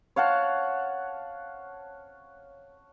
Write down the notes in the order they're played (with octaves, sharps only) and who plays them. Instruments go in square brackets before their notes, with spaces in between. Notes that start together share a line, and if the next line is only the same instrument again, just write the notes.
[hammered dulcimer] C#5 F5 F#5 A5